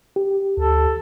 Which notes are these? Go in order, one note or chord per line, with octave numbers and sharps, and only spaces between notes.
G4
D2 A4